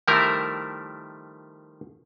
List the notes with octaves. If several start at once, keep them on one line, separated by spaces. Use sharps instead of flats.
D#3 F3 G3 A3 E4 A#4